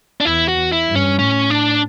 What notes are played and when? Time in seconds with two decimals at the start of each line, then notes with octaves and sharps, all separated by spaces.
0.20 D4
0.25 E2 E4
0.48 F#4
0.72 E4
0.88 G2
0.95 C#4
1.19 A2 C#4
1.50 D4